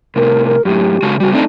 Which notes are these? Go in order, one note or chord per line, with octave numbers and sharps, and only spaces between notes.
A2 C3 A#4
A#4
F#2 A2 G4
C#3 G#3 F#4
C#3 G3 F#4
A3 C4 D4 D#4